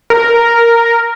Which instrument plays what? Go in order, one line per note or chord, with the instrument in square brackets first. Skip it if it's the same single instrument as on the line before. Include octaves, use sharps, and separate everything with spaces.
[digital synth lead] A#4